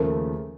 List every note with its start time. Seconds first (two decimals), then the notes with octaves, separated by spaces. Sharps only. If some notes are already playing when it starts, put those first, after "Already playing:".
Already playing: D#2 C#3 F3 A3 A#4